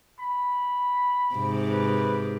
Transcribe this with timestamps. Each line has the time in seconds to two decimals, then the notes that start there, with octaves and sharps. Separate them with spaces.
0.20 B5
1.35 G#2 C3
1.72 B4